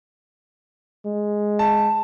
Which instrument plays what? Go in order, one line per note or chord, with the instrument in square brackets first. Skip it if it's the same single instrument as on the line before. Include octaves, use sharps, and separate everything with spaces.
[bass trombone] G#3
[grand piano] A5